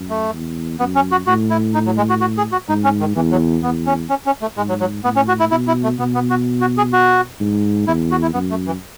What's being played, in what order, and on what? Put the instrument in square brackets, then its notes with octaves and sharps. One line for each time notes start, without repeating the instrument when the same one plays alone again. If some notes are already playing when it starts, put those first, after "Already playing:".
Already playing: [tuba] F#2
[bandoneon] A3
[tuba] E2
[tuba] F#2 [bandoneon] B3
[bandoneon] C#4
F#4
[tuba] A2 [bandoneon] F#4
[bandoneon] E4
D#4
F#3
G#3
F#4
F#4
G#4
F#4
[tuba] G#2 [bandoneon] D#4
[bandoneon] C#4
D#3
[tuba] E2 [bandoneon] E3
[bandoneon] F#3
[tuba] E2 [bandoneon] B3
[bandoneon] C#4
C#4
C#4
A3
[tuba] G#2 [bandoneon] G#3
[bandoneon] F#3
F#3
[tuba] A2 [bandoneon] B3
[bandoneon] C#4
F#4
E4
[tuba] B2 [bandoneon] E4
[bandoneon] E4
A3
[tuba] B2 [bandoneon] B3
[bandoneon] B3
F#4
F#4
G#4
F#4
[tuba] G#2
[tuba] E2 [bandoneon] E4
[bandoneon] F#4
E4
[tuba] F#2 [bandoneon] B3
[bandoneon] A3
E3